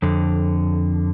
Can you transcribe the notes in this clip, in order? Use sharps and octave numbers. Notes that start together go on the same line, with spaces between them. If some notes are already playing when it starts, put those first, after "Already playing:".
F2 D3